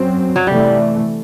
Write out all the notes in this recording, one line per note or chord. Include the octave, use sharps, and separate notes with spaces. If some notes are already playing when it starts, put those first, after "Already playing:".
Already playing: F#2 F#3 C4
F#3
C3 E3 G3 A3